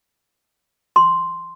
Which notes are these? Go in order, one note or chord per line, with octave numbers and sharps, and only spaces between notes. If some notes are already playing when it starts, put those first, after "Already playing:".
C6